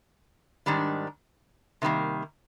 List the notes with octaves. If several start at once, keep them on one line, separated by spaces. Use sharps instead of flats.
G#2 D#3 G3 D4
C3 D#3 G3 A#3